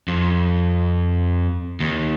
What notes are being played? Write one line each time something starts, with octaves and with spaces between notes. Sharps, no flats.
F2
D#2